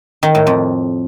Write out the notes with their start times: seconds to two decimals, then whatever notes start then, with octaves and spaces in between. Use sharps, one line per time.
0.23 D#3
0.35 A2
0.47 F2